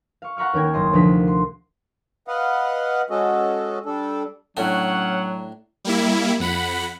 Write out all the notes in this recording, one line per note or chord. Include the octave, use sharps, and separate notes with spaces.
F5 C#6
F#5 A#5 B5 C#6 F6
D#2 C#4 A#4 G5 G#6
F#1 D#5 C6
D2 C3 F3 A#4 B6
C6
B4 D#5 F5 F#5
G#3 C#4 F#4 A4 D#5
G3 D4 A4
A2 F#3 C#4 D4 F#5
G3 A#3 E4
F2 F#5 B5